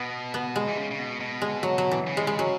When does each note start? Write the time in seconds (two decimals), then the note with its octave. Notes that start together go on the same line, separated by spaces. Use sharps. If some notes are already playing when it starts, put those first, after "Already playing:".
Already playing: B2 B3
0.34 B3
0.56 G#3
0.67 E3
0.78 C#3
0.91 C#3
0.98 B2
1.20 B2
1.42 G#3
1.63 F#3
1.78 F#3
1.91 E3
2.07 C#3
2.17 G#3
2.27 G#3
2.39 F#3